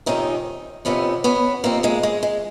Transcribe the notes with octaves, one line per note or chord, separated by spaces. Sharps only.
F2 C3 D#3 C#4 D#4
F2 C3 D#3 B3 C#4
B3 C#4
F2 C3 D#3 A#3 C4
G#3 A#3
G#3
G#3